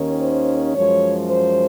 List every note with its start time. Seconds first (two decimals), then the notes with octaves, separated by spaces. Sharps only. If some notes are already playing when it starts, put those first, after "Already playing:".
Already playing: D#2 D#3 A#3 C#4
0.20 C5
0.75 F#2 F3 G#3 C#5
1.29 C5